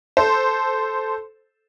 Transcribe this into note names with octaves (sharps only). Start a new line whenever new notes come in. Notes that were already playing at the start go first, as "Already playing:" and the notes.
A4 C5